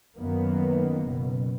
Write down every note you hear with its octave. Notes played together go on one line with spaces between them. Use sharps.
F#2 D#3 A#3 B3
F#1 B2